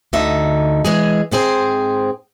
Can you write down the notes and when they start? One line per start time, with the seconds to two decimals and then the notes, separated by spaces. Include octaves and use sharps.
0.13 D2 D3 D#4 E5
0.85 E3 G#3 G#4
1.31 G#2 C4 G#4 C5